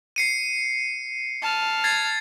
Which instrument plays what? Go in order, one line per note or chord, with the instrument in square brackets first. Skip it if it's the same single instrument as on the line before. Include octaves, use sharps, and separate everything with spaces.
[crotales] C7 C#7 D#7
[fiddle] A5 F6
[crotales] G#6 A6 C7